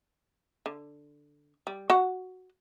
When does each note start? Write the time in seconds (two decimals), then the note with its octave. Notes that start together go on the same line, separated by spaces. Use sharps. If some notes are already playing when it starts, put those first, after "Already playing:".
0.66 D3
1.67 G3
1.90 F#4 F#5